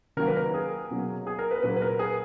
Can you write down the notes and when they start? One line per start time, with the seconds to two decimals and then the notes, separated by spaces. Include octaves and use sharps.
0.17 D#3 F#3 A#3 A#4
0.27 B4
0.37 A#4
0.54 G#4
0.90 B2 F#3 A#3
1.27 G#4
1.39 A#4
1.51 B4
1.62 A#2 F#3 A#3 B4
1.76 B4
1.82 A#4
1.99 G#4